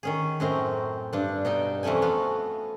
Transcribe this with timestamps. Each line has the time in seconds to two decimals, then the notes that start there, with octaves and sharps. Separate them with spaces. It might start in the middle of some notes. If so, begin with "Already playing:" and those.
0.03 D#3 C#4 G#4
0.40 F#2 A2 C4 C#4 A#5 C6
1.13 G2 D4
1.45 B2 D#4 G5
1.83 F2 E3 A3 C#4 G#5
2.02 B3 F#4 F5